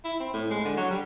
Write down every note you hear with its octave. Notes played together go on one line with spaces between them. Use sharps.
E4
C4
A2
G#3
D3
F#3
G3